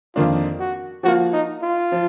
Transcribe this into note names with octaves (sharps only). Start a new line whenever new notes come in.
F2 D#3 A#3 D4 F4
F#4
F3 A#3 F4 F#4
D#4
F4
F3